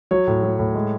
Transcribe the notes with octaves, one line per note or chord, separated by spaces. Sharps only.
F#3 C#5
A2
F#3
A2
G#3